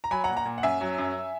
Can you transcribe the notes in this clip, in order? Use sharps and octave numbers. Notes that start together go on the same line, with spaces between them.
A#5
F#3 G#5 B5
F#5 A#5
A#2
F#5 A#5
A#2
F#5
F#2 E5 G#5
F#3
F#2